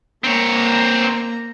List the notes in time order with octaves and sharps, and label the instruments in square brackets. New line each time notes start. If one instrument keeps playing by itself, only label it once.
[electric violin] A#3 A#5 [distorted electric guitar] C4 C#5